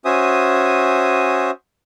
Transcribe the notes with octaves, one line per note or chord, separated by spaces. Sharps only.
C#4 F#4 C5 E5 G#5 D#6